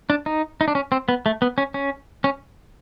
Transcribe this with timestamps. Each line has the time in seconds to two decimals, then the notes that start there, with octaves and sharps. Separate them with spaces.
0.10 D4
0.26 D#4
0.61 D#4
0.68 D4
0.75 C#4
0.92 C4
1.09 B3
1.26 A3
1.42 B3
1.58 C#4
1.74 C#4
2.24 C#4